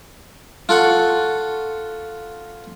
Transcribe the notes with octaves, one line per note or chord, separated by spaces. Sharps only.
F4 A4 F#5 C#6